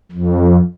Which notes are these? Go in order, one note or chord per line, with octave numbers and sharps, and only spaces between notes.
F2